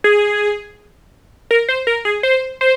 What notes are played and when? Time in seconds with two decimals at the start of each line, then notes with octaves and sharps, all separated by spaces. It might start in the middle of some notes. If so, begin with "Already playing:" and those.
0.04 G#4
1.51 A#4
1.69 C5
1.87 A#4
2.05 G#4
2.23 C5
2.61 C5